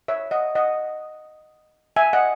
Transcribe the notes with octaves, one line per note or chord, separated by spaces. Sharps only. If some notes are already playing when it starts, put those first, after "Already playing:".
C#5 E5
D#5 F#5
D#5 F#5
E5 G#5
D#5 F#5